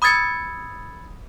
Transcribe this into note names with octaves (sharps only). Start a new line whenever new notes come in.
B5 D#6 E6 G#6 A6 C#7